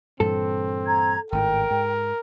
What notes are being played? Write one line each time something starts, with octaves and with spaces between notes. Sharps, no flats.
G2 A#2 E3 C4 A4
A#5 G#6
G#1 A2 A#4 G5
G#2